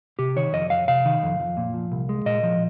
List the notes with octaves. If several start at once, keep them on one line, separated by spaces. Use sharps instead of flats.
C3 G4
D#3 C#5
F2 D#5
F2 F5
C3 F5
D#3
F2
F2
A#2
F3
C2
G#3
A#2 D#5
F3